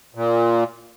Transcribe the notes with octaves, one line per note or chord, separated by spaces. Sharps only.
A#2